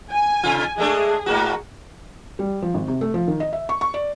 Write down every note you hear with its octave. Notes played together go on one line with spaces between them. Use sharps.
G#5
C3 F4
G#3 A3 D4 G#4
G#2 A#3 F#4
G3
F3
G#1
C3
A3
F3
D#3
D#5
E5
C#6
C#6
D5